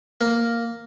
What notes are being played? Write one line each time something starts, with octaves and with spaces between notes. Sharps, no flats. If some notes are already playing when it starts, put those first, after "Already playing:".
A#3